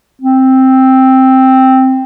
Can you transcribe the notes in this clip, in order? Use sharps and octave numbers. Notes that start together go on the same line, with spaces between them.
C4